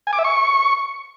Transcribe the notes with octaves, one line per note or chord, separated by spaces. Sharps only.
G#5
D6
E5
C#6